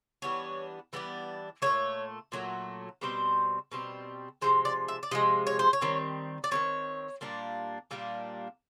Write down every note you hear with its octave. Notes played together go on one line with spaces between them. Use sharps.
E3 G3 B3 D4 C#5
E3 G3 B3 D4
A#2 F#3 A3 C#5
A#2 F#3 A3
B2 G3 C4 C5
B2 G3 C4
C3 F3 G#3 C5
D5
E5
D5
C3 F3 G#3 D#5
C#5
C5
C#5
D#3 G3 C4
D5
D#3 G3 C4 C#5
A#2 G3 A#3 D4
A#2 G3 A#3 D4